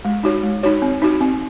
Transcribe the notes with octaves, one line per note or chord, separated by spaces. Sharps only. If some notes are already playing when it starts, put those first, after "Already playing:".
G#3
D#4 F#4 C#5
G#3
D#4 F#4 C#5
C4
D#4 F#4
C4